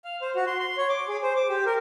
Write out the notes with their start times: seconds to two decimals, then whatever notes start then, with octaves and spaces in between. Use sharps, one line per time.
0.05 F5
0.22 C5
0.35 F#4
0.47 C6
0.59 C6
0.77 C#5
0.89 D6
1.08 G#4
1.23 C5
1.36 D6
1.49 G4
1.66 A#4